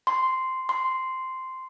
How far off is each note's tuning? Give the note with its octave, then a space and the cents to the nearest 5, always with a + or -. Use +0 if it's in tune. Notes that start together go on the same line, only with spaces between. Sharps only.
C6 -5
C6 -5